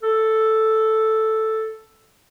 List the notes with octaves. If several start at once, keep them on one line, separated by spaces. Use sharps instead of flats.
A4